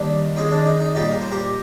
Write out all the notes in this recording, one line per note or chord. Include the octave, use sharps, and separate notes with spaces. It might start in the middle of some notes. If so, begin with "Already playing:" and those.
Already playing: D#3 G3 A#3 D4
D#3 G#3 C4 D#4
D4
D#4
D#4
A#2 G3 A#3 D#4 G4
A#4
C5
G4 A#4